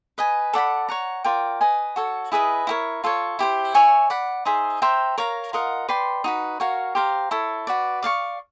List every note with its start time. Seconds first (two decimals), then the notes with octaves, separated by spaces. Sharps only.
0.18 B4 D#5 G#5
0.53 A4 D5 F#5 B5
0.89 C#5 F#5 A#5
1.24 F4 A#4 D5 G5
1.61 B4 D#5 G#5
1.96 F#4 A4 C#5
2.32 E4 G#4 B4 D#5
2.67 E4 G4 A#4 C#5
3.04 F4 A4 C#5
3.39 E4 G4 C5
3.74 C#5 E5 G#5 C#6
4.10 D5 F#5 B5
4.45 D#4 G#4 C5 E5
4.82 C5 E5 G5 A#5
5.18 A#4 C#5 F5 A#5
5.53 F4 A#4 D#5 F#5
5.89 B4 D5 G5 C6
6.24 D#4 F#4 B4
6.60 F#4 A#4 C#5 F5
6.95 G4 C5 F5 A#5
7.31 E4 A4 C#5
7.67 F#4 B4 D5
8.02 D5 F5 A5 C#6